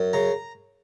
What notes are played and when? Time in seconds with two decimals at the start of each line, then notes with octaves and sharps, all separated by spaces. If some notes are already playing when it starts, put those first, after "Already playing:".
Already playing: F#2
0.13 C#3 A#5